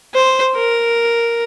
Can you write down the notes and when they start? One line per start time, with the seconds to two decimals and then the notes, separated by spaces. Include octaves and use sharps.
0.14 C5
0.55 A#4